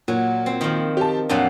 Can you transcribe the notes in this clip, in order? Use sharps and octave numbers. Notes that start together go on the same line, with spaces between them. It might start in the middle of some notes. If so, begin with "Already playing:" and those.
A#2 F#3
C4
D#3 F3
G4 A5
F2 A#2 F#3 D4